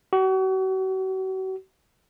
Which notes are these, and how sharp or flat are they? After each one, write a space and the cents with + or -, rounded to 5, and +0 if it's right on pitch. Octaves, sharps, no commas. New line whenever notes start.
F#4 +40